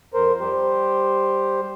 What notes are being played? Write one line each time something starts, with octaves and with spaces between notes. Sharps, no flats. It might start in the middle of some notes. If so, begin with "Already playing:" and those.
F2 A#4 C5
G3 G4 C5